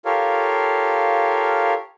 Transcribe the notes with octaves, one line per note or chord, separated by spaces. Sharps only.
F4 G4 A4 A#4 C#5 F5